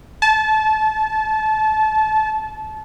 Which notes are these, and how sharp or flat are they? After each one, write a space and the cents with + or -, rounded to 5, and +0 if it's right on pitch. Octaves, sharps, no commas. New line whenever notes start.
A5 -25